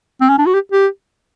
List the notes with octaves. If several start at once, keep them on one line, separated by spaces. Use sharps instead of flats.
C4
C#4
D4
F#4
G4
G4